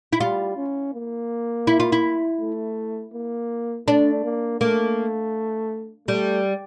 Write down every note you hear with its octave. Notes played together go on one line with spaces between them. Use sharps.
E4
G3 F4
C#4
A#3
E4
F4
E4
A3
A#3
A3 D4
A#3
A3 A#3
G3 A3